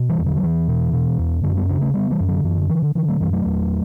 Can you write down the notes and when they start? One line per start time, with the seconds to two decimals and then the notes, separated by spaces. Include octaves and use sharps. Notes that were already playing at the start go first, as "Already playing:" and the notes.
Already playing: B2
0.09 E3 G3
0.18 E2
0.26 D3 F#3
0.37 F#3
0.42 E2 E3
0.68 B2
0.93 B2
1.18 E2
1.44 F#2 D3
1.51 C#4
1.56 G3 B3
1.69 C#3 B3 D4
1.81 A3 C#4
1.94 C#3 G3 B3
2.11 E3 G3
2.20 F#2
2.28 D3 F#3
2.44 F#2 E3
2.57 D3
2.69 D3 E3
2.82 D3
2.95 D3 E3
3.08 F#3 A3
3.20 F#2 E3 G3
3.33 F#3 A3
3.45 E2